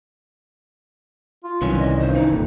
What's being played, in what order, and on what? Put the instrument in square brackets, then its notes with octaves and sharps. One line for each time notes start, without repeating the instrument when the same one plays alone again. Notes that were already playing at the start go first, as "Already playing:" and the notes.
[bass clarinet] F4
[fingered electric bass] C2 [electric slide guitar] D#3 E3 C#4 [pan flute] F#3
[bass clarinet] A#2 [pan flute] D#5
[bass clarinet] G2 [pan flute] C5
[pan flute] D#4
[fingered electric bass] G1 A#2 [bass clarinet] F2